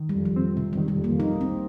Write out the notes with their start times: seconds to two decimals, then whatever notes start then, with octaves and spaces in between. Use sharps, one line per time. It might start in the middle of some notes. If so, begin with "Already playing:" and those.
Already playing: D#3
0.09 G3
0.15 F2
0.26 F3
0.36 C4
0.57 C3 G3
0.73 D#3 G3
0.88 G3
0.99 F2
1.04 A#3
1.19 A#3 D#4
1.41 C2 C4